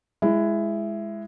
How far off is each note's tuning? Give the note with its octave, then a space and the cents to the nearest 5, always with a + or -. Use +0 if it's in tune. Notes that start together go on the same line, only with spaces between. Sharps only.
G#3 +0 E4 +15